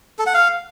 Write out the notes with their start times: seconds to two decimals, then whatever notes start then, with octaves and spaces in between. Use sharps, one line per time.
0.19 A4
0.26 F#5
0.34 F5